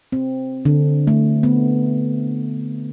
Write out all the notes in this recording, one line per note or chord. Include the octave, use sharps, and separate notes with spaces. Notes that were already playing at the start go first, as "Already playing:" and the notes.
C4
D3
A3
B3